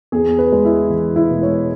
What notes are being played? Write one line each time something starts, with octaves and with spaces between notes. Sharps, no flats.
E2 G#4
B4
G#3
E4
E3
E4
E1
C#5